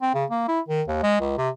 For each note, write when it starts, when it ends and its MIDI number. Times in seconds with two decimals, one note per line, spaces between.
0.02 0.11 60
0.14 0.25 49
0.30 0.46 58
0.48 0.60 64
0.68 0.82 51
0.88 0.98 39
1.03 1.19 56
1.20 1.37 37
1.37 1.49 48